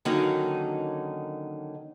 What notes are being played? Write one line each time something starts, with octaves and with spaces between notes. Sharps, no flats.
D3 D#3 F#3 A#3 C#4 D#4